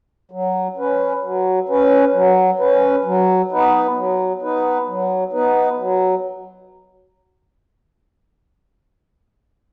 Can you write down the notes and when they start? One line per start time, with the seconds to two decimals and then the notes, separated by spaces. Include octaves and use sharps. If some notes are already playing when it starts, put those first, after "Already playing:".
0.31 F#3
0.77 C#4 B4
1.23 F#3
1.68 C#4 B4
2.14 F#3
2.59 C#4 B4
3.05 F#3
3.51 B3 D#4 B4
3.96 F#3
4.41 B3 D#4 B4
4.87 F#3
5.32 B3 D#4 B4
5.78 F#3